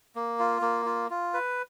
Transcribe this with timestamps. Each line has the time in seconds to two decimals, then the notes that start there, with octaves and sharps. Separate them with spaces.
0.16 A#3
0.39 F4
0.62 A#3
0.86 F4
1.10 F4
1.34 B4